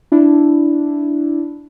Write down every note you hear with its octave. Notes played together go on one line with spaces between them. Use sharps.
D4 E4